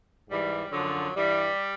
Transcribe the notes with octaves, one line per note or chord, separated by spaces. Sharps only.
G#2 E3 G3
F#2 D3 F3 F#3
G2 E3 G3